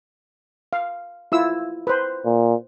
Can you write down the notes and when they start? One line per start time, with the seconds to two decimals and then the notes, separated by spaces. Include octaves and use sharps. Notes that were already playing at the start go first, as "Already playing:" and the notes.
0.73 F5
1.32 E4 F4 E6
1.87 B4 C5
2.25 A#2